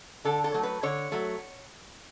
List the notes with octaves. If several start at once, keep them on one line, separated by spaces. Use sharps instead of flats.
D3 A4
A4
F#3 A3
B4
D3 C#5
F#3 A3